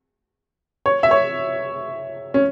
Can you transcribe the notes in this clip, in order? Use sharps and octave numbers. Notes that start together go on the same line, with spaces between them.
C#5
E5
C#5
C#4